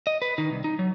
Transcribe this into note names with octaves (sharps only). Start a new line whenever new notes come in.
D#5
B4
D#3 D#4
C2
D#4
F#3